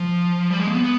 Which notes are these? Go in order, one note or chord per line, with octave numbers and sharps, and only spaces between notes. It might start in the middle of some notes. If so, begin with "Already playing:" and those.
Already playing: F3
G3
G#3
A#3
B3